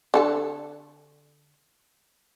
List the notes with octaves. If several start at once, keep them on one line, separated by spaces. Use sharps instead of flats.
D3 A4 A5